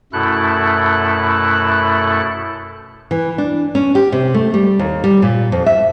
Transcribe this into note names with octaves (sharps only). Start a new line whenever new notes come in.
F#2 B2 A3 E4 A4 F#6
E3
D4
C#4
G4
C3
A3
G3
D#2
G3
A#2
F2
E5